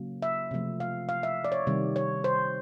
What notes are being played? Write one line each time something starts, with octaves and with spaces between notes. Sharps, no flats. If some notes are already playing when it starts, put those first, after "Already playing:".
Already playing: C#3 F#3 A#3
E5
C3 F3 A3
F5
F5
E5
D5
C#5
C3 D#3 G3
C#5
C5